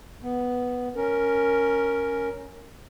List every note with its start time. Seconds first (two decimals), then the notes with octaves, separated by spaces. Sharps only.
0.23 B3
0.96 C#4 A#4